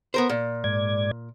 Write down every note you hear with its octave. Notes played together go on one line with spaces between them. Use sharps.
B3 A#4 C5
A#2
G#2 D5 G#6